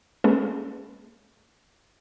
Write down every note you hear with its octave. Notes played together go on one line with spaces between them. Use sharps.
G#3 A#3 C#4 A4 B4